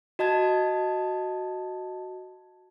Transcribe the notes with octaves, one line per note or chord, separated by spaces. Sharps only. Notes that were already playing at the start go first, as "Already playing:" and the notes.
F#4 D#5 A5 G#6